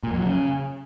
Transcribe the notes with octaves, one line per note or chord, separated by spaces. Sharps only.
A#2
F2
F#3
C#3